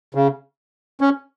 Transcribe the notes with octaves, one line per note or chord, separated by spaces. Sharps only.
C#3
C#4